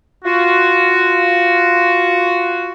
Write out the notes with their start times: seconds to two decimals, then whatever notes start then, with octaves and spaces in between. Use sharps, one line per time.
0.24 F4 F#4